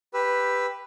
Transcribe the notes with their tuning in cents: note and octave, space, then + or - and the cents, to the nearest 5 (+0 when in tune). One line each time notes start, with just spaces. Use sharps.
G4 +5 B4 +0 E6 +0